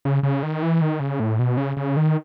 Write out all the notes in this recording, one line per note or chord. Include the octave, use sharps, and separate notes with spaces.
C#3
C#3
D#3
E3
D#3
C#3
A2
B2
C#3
C#3
D#3